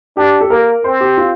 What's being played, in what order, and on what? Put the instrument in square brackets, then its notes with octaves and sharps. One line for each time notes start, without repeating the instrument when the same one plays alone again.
[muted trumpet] D4 [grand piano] G4
[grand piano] A4
[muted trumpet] A#3 [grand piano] A#4
[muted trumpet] C4 [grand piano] C5
[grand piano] G4
F4